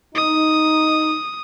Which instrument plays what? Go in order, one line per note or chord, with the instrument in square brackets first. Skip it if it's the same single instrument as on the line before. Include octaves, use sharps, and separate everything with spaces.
[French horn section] D#4 [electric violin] D#6